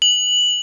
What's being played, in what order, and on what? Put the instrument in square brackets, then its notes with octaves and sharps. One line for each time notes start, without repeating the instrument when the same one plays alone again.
[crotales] F#7